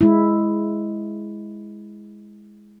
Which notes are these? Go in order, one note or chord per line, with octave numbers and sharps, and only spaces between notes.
G#3 E4